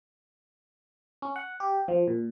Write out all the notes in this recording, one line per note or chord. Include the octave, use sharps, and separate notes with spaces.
C#4
F#5
G4
F3
A#2